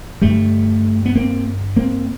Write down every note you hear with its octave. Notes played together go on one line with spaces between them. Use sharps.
G2 D3 G3 A3
B3
A#3 C4
A#3 C4